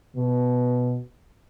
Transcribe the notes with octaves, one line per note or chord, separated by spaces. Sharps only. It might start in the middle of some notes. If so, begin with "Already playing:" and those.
B2